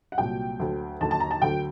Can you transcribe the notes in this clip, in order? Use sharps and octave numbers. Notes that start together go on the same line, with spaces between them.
F#5
C2 A#2 F#3 G5
D2 D3 F#3
D#2 D3 F#3 A5
A5
A#5
A5
D2 D3 F#3 G5